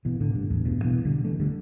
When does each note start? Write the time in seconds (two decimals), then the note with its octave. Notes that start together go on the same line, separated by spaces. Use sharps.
0.05 B2 E3
0.20 A2 D3
0.35 G2
0.50 E2 A2
0.65 G2 B2
0.85 B2 E3
1.05 D3 G3
1.24 E3 A3
1.40 D3 G3